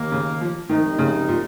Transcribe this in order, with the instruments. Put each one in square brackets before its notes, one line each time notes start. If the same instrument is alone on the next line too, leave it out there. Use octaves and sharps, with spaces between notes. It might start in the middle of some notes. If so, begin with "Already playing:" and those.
Already playing: [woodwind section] D#2 D#3 A#3
[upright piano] C#3
F3
[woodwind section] C2 C3 F3 G#3 D#4 [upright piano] D#3
[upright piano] C#3
A#2